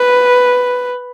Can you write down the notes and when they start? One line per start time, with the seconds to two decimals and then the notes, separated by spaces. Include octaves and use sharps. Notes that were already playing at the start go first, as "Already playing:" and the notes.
Already playing: B4